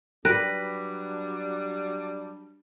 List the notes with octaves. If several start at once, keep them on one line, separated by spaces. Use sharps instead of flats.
F#3 G3 D4 B4 G5 F#6 A#6